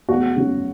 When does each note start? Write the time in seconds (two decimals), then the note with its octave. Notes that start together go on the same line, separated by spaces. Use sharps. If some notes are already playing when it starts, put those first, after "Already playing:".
0.09 E2 F#4
0.36 C#3 F#3